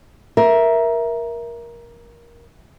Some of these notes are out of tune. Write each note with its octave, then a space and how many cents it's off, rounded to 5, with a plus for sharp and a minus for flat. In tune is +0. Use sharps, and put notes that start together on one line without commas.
A#4 +15 E5 +0